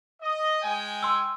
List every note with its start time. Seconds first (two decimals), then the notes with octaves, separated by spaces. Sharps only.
0.22 D#5
0.63 G#3 G5 G#5
1.03 C6 E6